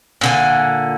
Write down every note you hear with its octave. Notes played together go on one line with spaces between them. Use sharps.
A#2 D3 G#5